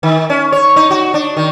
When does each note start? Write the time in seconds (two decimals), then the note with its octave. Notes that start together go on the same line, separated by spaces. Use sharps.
0.03 D#3
0.30 C#4
0.52 C#5
0.76 D#4
0.91 F#4
1.14 D4
1.37 D#3